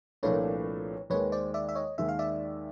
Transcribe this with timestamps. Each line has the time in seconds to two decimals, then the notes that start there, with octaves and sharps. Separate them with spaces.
0.23 C2 A#2 F3 A3 D4 B4 C#5
1.10 D#2 D#3 G#3 B4 C#5
1.32 C5 D5
1.54 D5 E5
1.69 E5
1.75 C#5 D#5
1.98 D#2 D#3 G#3 E5
2.08 F5
2.19 D5 E5